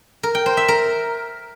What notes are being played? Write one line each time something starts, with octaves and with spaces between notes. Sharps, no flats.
A#4
G5
C5
E5
A#4